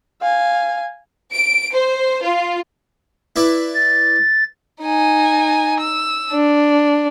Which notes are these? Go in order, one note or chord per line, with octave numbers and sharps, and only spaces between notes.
F5 G#5
D7
C5
F4
E4 B4 D5
A6
D#4 G#5
E6
D4